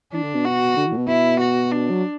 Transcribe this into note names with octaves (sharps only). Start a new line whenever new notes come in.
E3 D4
D3
B2
F#4
D3
E3
A2
B2
B2 E4
F#4
D4
F#3